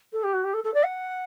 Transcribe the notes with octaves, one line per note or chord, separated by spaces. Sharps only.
A4
G4
F#4
G4
A4
A4
D5
F#5